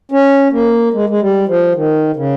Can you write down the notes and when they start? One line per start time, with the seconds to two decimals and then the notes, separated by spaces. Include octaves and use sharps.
0.11 C#4
0.52 A#3
0.93 G#3
1.09 G#3
1.21 G3
1.48 F3
1.75 D#3
2.16 C#3